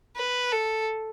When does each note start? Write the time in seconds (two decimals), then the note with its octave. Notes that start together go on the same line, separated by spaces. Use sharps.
0.16 B4
0.52 A4